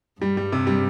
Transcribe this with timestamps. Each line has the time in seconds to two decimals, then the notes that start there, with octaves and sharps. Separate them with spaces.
0.21 G2 G3
0.37 G3
0.52 C3
0.67 G3